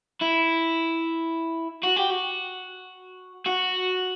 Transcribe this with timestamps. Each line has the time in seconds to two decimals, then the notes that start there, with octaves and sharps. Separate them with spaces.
0.22 E4
1.83 F#4
1.97 G4
2.10 F#4
3.46 F#4